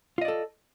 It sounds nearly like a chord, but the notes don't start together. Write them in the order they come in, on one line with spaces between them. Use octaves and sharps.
F4 D#5 D5 A4